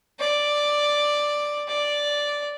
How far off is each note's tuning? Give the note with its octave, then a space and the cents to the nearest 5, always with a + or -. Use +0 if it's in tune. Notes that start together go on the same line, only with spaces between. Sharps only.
D5 +5
D5 -5